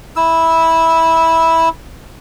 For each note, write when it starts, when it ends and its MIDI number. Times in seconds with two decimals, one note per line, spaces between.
0.16 1.69 64
0.16 1.69 88